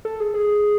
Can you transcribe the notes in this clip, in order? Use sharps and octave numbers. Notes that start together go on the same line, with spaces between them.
A4
G#4
G#4